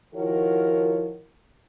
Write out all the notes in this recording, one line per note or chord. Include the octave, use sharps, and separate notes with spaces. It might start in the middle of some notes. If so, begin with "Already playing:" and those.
D#3 F3 E4 F#4 A#4 C#5